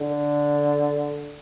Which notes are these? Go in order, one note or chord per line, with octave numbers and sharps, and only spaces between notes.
D3